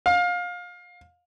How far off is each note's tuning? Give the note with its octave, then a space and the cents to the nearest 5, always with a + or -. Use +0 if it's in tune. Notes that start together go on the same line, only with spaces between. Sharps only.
F5 +25